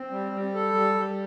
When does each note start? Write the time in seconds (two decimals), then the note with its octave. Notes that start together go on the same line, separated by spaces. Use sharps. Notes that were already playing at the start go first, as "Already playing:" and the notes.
Already playing: C4
0.11 G3
0.32 G3
0.54 A4
0.74 G3
0.95 G3